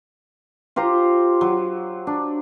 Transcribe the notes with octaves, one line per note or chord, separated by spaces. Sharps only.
F4 G4 C5 A#5
F#3
D4